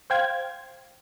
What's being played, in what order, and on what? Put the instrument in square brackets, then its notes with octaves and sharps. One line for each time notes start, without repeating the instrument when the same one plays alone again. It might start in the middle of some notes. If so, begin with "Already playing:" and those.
[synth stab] C5 F5 G5 G#6